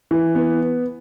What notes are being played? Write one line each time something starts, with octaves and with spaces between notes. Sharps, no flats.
E3
B3